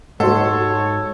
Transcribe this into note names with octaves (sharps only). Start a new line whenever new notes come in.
G#2 F#4 A4 C#5 F#5